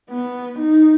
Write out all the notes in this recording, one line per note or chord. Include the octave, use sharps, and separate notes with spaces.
B3
D#4